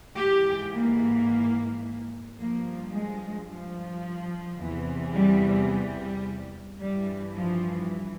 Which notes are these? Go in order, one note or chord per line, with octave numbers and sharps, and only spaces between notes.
G#2 E3 G4
A#3
G2 F3 A#3
G#3
F3
E2 C3 E3
G3
G3
G2 E3 G3
F3